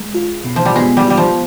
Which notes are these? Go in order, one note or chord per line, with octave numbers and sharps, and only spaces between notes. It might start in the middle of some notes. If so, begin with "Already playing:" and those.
Already playing: G#3
F4
B2
F3
G3
G#3 B3
G3
G3 F4
F3